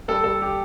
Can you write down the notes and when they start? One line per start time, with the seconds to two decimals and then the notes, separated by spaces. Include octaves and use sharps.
0.08 G3 A4
0.24 G3 A4
0.42 G4